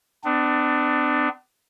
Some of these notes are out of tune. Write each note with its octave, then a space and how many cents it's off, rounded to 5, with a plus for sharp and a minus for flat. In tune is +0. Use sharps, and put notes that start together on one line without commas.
B3 +45 D4 +20